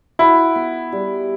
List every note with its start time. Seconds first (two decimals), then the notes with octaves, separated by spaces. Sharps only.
0.19 E4 F#4
0.55 B3
0.92 G3